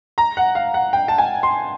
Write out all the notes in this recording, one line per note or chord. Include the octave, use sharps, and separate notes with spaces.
A#5
F#5
F5
F#5
G5
A5
G#5
C6